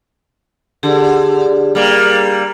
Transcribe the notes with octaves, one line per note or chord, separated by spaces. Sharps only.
D3 G4 G#4
G3 A#3